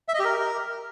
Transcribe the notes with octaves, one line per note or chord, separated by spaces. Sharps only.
E5
D#5
G4
A#4